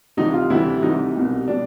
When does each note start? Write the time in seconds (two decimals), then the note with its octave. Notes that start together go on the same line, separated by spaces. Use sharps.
0.17 D2 C3 E3 G3 D#4
0.34 F4
0.50 D2 C3 E3 G3 E4
0.82 D2 C3 E3 G3 D#4
1.16 C2 B2 G3
1.48 B2 G3 D4